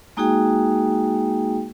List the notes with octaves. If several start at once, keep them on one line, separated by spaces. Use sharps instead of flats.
G#3 A#3 D#4 F#4 G#4 G5